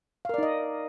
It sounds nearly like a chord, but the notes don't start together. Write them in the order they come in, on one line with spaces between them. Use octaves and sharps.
F5 A#4 D5 D#4 D#5